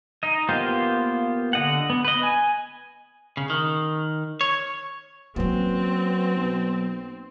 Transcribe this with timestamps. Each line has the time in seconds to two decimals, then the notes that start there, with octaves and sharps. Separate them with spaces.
0.23 D#4 D#5
0.49 A#3 B3 F4 G4 C5
1.53 D3 D#5 F#5
1.90 B3
2.04 B4 D#5
2.23 G#5
3.37 C#3
3.50 D#3
4.41 C#5
5.36 F#3 A#3 C4 C#4 B4
6.37 B1